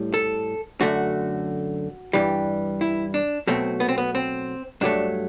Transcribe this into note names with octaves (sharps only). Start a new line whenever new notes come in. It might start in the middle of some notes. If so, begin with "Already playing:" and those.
Already playing: A2 G3
A4
F#2 D3 A3 F#4
G2 E3 G3
E4
D4
B2 F#3 A3 C4
B3
C4
B3
C4
G2 F#3 A3 D4